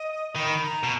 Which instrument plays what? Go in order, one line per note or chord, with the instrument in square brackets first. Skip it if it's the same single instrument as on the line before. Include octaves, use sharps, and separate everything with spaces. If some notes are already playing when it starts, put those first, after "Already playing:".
Already playing: [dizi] D#5
[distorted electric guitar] D#3 [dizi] B5
[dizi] A#5
[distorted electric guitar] B2